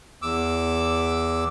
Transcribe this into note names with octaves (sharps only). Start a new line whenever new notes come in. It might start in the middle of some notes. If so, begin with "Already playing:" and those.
E2 D6 E6